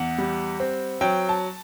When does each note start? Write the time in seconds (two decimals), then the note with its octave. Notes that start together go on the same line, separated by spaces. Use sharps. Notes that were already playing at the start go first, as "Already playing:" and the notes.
Already playing: E2 F#5
0.18 G3
0.60 C4
1.01 F#3 G5
1.29 A5